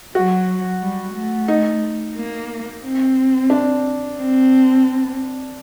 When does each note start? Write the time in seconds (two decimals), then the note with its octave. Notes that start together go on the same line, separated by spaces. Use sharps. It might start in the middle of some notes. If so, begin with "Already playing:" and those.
0.15 F#3 F#4
0.81 G3
1.15 A3
1.48 D#4
2.16 A#3
2.83 C4
3.50 D4
4.17 C4